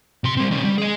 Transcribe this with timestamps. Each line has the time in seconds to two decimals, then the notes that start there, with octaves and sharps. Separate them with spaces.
0.24 C3 C6
0.37 G3 C4
0.51 D#3 C#4
0.65 G3
0.78 G#4 D#5